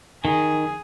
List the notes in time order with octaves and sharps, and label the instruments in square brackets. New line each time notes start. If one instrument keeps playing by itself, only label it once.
[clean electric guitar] D#3 [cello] G#4